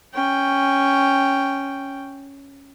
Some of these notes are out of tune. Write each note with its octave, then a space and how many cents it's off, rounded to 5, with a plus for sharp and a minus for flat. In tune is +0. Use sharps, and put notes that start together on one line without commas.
C#4 +0 G5 +0